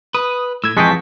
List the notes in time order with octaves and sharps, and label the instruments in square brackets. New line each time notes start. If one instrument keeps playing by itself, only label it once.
[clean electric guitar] B4 [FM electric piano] D#6
[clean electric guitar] A2 [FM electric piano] E6 G#6
[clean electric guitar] F2 E3 [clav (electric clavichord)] G#3 G#4 G5 [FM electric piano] A5 C#6 B6